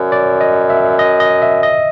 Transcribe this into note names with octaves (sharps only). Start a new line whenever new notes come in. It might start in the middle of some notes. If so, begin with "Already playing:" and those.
Already playing: F#2 C#5 D5
D5
D#5
E5
D#5
D#5
E5
D#5